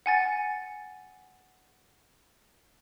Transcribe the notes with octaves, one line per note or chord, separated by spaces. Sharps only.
F#5 G#5 A6